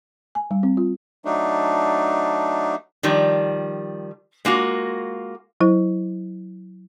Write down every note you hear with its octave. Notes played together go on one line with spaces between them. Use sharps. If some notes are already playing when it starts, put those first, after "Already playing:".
G#5
G3
C4
F4
F#3 A3 D4 D#4
D#3 F3 G3
G#3 A#3 F4 F#4
F#3 E4 C5